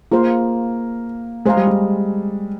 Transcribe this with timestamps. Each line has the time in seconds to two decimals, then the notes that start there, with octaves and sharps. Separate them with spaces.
0.11 A#3 F4 G#4 C5 F5
1.45 G#3 G#4 C5 F5 A#5
1.57 G3
1.68 G#3